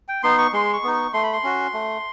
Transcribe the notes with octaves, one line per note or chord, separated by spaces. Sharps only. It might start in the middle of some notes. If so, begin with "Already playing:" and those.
G5
B3 D#4 C6
C#6
G#3 C6
C#6
B3 D#4
C#6
A3 C6
B5
C6
C#4 F#4
A3